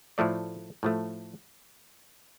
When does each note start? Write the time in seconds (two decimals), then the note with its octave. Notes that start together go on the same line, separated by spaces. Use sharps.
0.18 A2 F3 A3 D5
0.83 A2 F3 A3